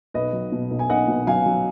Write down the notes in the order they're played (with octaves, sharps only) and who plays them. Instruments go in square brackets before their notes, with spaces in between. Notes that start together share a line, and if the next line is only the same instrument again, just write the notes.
[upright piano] B1 B4 D#5
F#3
B2
B1
G#5
B1 D#5 F#5
B2
F#3 F5 G#5
F#3